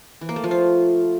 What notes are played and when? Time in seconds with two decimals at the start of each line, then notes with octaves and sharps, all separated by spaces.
0.21 E3
0.29 A#3
0.36 A3
0.44 F3
0.51 F4